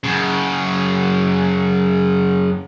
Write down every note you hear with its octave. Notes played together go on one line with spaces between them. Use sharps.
F#2 C#3